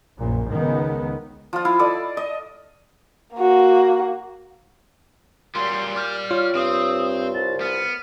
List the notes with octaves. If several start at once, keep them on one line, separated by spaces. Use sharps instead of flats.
A#1 F#2 A#2
C#2 D#3 B3
F3 F4
E4 F5
A4 D5 D#5
D#5
A#3 F#4
A#2 F#3 G3 C6
D5 G5 F6
F4 C#5
G2 C4 D#6
C2 A6
B3 F6